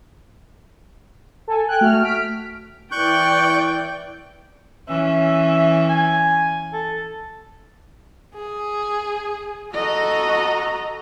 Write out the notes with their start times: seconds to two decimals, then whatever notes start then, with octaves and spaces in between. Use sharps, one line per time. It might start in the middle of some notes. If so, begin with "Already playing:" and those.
1.48 A4 G#5
1.69 G5 G#5 F#6
1.81 A3 F#4 F6
2.03 F6 B6 D7
2.92 E3 D5 G5 C#6 F#6 G6
4.88 E3 C#4 E5
5.89 G#5
6.73 A4
8.35 G#4
9.74 F#4 A4 D#5 A#5